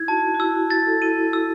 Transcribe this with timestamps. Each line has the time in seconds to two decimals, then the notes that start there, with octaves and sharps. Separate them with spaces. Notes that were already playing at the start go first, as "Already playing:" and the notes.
Already playing: D#4 E4 G#6
0.08 F#4 A5
0.35 F#4
0.40 E4 E6
0.55 F#4
0.70 A6
0.86 A4
1.02 E4 D#7
1.33 E6